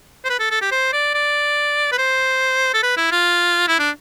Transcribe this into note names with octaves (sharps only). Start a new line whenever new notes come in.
C5
B4
A4
A4
G4
C5
D5
D5
B4
C5
A4
B4
E4
F4
E4
D4